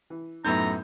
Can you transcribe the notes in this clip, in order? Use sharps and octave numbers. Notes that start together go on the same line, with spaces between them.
E3
F#2 A2 B3 D#4 A#5 G6